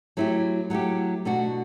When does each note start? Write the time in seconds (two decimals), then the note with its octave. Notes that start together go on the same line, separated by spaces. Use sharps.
0.17 F#3 A3 E4 G4
0.70 F#3 A3 E4 G4
1.25 B2 A3 D4 F#4